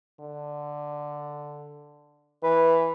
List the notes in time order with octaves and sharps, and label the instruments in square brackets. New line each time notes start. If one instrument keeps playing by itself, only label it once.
[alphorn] D3
[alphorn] E3 [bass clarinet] B4